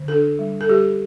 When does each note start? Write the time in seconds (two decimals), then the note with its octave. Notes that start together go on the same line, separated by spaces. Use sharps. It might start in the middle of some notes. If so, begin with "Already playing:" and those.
Already playing: D3
0.08 D4 A4
0.39 G3
0.61 A4
0.69 G3 G4